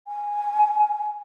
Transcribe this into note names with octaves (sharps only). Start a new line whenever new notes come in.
G#5